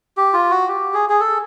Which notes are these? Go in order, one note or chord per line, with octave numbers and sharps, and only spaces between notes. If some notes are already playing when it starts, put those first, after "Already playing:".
G4
F4
F#4
G4
G#4
G#4
A4